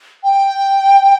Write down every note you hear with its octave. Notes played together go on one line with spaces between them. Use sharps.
G5